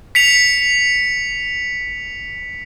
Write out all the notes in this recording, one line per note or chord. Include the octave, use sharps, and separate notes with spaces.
B6 C#7 F7